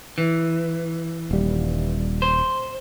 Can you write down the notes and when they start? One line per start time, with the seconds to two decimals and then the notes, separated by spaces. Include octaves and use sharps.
0.18 E3
1.31 D#1 G3
2.22 C5